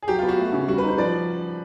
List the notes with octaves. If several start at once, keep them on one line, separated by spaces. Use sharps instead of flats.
G#4
F#3 G4
F4
B3
F#4
A3
C#3
G3 F#4
B4
D#4
C5
F3 D5